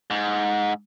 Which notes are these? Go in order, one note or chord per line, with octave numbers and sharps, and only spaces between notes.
G#2